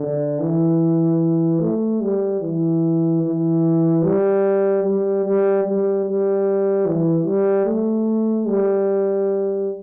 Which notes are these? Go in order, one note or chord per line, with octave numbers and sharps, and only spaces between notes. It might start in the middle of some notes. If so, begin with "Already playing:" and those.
Already playing: D3
E3
A3
G3
E3
E3
G3
G3
G3
G3
G3
E3
G3
A3
G3